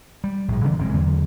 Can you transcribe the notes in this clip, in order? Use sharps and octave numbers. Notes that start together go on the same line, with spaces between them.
G3
A#1 A2
C#3 E3 F3 A#3
F1 E2 G#3 C4
E2 D3 F#3 A#3